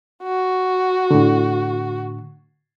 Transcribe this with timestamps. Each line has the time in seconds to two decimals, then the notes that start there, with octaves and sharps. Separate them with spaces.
0.23 F#4
1.11 A2 D3